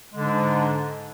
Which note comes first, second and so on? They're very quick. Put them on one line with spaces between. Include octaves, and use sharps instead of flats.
G#3 D3 D4 G#2